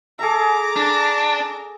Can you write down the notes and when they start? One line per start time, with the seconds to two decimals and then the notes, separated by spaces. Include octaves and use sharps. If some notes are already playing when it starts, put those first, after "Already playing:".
0.19 G#4 A4 E5 A#5 D6
0.76 D4